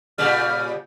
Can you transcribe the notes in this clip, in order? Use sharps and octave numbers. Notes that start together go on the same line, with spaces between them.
A#2 C#3 G3 F6